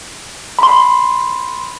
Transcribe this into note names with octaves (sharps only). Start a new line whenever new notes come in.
B5 C6